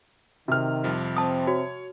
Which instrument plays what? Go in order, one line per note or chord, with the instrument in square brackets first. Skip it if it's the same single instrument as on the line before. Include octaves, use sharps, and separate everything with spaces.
[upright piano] C3 F6 [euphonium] D#3
[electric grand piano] F2 F3 G3
[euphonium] C4 [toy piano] A5 D#6
[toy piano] F#4 [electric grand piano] C#5